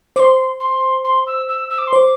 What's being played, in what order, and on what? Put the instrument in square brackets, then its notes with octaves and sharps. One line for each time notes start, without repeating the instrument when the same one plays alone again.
[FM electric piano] C5 [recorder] D6
[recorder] C6
C6
C6
E6
E6
E6
D6
C6
[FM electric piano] C5 [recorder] D6